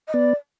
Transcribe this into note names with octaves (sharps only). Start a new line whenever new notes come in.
D#5
B3 D5